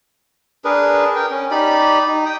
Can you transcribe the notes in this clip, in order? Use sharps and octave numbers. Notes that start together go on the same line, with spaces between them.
D4 G#4 A#4 B4
A#4 G5
C#4
D#4 G4 D5 B5
D#4
G5 D#6